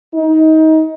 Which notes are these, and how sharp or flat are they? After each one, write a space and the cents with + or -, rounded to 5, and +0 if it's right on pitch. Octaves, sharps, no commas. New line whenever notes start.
D#4 +25